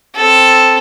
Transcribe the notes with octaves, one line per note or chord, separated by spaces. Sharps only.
C4 A4